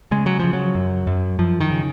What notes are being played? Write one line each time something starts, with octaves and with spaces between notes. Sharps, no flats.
C#3 G#3
F#3
C#3 F3
F#3
F#2
F#2
F#2 F3
D#3
C#3